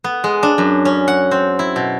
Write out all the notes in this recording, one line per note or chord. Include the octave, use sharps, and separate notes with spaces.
B3
G#3
D4
F#2
C#4
F#5
C4
E4
B2